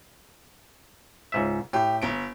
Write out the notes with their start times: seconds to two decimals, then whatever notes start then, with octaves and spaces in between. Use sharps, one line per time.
1.32 C#2 G#2 E5
1.73 A2 G4
2.02 G1 D7